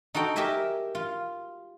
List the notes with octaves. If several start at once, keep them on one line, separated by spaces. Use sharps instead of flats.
D#4 F#4 A4 G5
G4 A#4 D#5 E5 G#5
F4